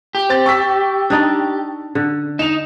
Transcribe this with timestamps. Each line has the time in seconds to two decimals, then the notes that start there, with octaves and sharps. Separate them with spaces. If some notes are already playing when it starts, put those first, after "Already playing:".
0.15 G4
0.29 C4 A6
0.46 C#6 E6 B6
1.10 D4 D#4 D5
1.95 D3
2.39 D#4 E7 F7